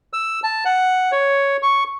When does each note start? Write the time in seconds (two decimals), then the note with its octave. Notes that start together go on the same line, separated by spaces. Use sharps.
0.13 E6
0.43 A5
0.65 F#5
1.12 C#5
1.62 C#6